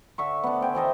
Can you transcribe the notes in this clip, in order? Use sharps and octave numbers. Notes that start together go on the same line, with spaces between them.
D3 E5 C#6
B3 D4
C5 G5 G#5
E3 A4 D#5 E5